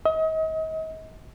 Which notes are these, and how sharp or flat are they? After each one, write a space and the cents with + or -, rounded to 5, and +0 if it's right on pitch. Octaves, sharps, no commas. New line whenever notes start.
D#5 +35